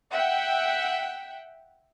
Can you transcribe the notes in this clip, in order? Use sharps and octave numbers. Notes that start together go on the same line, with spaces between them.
E5 F#5 G5